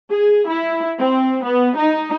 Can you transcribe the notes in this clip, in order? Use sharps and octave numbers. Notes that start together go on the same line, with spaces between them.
G#4
E4
C4
B3
D#4